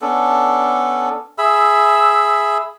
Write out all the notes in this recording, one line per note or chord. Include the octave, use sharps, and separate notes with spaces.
B3 C#4 D4 A4
G#4 E5 B5 E6